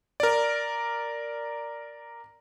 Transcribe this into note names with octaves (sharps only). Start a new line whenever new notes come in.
A#4 D5